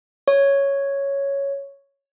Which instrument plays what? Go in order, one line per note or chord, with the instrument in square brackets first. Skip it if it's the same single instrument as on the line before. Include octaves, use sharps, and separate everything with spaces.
[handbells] C#5